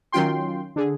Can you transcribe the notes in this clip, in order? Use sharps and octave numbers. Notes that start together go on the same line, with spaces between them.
D#3 F#3 C#4 F4 G5 C6
D3 G#4